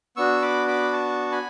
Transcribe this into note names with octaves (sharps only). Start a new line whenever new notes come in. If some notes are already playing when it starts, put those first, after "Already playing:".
B3 D4 F#4 C#6 E6
B5 D6
B5 D6
A5 C#6
G#5 B5